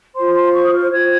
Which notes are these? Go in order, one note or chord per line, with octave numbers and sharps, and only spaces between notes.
F4 C5 C6
C6
C#6
D#6
F6
F4 C5 G#6